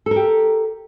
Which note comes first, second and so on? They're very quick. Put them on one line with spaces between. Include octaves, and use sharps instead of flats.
A4 A#4 G4